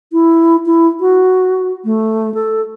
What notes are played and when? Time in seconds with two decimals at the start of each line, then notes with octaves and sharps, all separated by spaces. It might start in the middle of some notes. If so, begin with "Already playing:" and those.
0.12 E4
0.66 E4
1.00 F#4
1.85 A3
2.34 A4